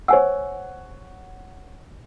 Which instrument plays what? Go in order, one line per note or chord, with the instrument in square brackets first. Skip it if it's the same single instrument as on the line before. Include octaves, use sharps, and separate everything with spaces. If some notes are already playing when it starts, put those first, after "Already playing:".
[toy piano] C5 G#5 E6 [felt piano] C#5 F#5